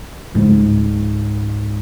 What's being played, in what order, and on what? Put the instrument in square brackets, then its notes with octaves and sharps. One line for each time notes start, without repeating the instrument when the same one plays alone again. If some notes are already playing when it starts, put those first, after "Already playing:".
[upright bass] C#2 G#2